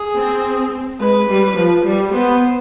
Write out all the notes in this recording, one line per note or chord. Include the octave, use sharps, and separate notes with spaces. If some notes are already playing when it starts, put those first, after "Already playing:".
Already playing: G#4
C4
G#3 B4
G3
F3
G3
B3 C5